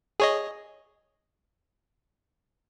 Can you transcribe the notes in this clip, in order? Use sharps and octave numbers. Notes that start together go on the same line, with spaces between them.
G#4 C#5 D#5